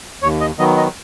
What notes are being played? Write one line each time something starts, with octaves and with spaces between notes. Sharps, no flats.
D#2 C#5
D#5
D#3 F#3 B3 D#5
D#5